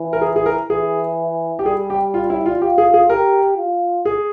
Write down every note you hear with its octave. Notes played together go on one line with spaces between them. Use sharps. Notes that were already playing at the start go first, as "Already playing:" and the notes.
Already playing: E3
A#4
G#4
G#4
A#4
E3 G#4
G4
G3 G#4
G4
F4
E4
F4
F4 G4
G#4
G#4
G4 A#4
F4
G#4